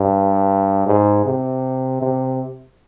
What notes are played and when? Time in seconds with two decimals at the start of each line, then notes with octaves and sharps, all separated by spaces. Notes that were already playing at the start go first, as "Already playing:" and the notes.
Already playing: G2
0.86 G#2
1.26 C3
2.02 C3